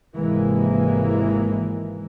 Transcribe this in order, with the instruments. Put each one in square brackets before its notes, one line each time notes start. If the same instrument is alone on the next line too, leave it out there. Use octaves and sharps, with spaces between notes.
[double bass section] G#1 C3 E3 G#3 A#3